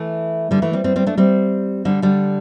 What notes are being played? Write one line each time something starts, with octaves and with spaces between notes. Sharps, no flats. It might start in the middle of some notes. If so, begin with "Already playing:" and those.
Already playing: E3 A3
D3 G3
E3 A3
G3 C4
G3 C4
G3 C4
A3 D4
G3 C4
D3 G3
D3 G3